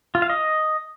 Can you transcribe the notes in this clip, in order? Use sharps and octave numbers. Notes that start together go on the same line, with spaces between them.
F4
F5
D#5